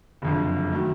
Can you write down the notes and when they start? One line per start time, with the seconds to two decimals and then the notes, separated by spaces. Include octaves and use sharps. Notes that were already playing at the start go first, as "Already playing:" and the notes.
0.22 F#1 F2 D3
0.72 D#3 F#3 A3